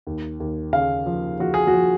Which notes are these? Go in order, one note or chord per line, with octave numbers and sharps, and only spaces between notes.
D#2
D#2
C#3 F5
F3
F3 F#4
G#4
F#4
F3